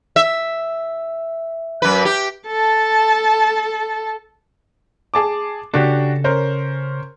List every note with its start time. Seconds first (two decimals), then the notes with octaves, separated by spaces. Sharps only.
0.16 E5
1.82 F#2 B4
2.05 G4
2.47 A4 A5
5.14 G#4 A5 D6
5.74 C#3 D4 F#4 G4 A4
6.24 C#4 A#4 C5